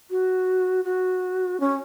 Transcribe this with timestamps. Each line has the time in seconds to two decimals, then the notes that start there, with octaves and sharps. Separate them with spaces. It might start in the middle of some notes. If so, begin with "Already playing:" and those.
0.10 F#4
0.84 F#4
1.60 C#4